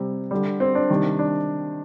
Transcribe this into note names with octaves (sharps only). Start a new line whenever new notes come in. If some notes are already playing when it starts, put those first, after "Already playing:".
Already playing: C3 G3
D3 G3
C4
D4
C3 D#3 G3
D4